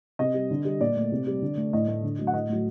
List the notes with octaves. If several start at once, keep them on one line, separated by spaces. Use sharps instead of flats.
C3 D#5
G3
D3
G3
A#2 D5
A3
C3
G3
D3
A3
A2 D#5
A3
D3
F#3 A3
F#5
A2 D#5
F#3 A3